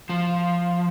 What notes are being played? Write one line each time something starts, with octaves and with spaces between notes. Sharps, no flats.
F3